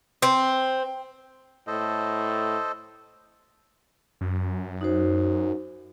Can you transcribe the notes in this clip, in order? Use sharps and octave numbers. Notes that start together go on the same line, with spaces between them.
C4
A2 A4 C5 D#5
F#2
D#4 F#4 C5